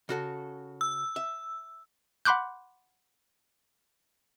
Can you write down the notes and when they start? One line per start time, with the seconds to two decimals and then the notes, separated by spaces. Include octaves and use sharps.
0.09 C#3 F#4 A4
0.81 E6
1.16 E5
2.25 F#5 B5 C6 D6 F#6 G6